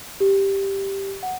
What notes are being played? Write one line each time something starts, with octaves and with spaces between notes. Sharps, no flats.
G4
F#5